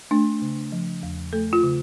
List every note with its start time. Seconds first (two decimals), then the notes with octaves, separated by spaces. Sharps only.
0.11 A3 D4
0.42 C#3
0.72 F3
1.03 E2
1.33 A3 A4
1.53 F4
1.63 C#3